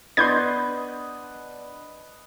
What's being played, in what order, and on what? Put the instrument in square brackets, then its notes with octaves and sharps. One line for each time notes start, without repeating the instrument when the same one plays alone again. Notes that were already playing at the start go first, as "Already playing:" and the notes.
[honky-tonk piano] B3 D4 [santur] B4 D#5 [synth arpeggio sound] C6 G6 G#6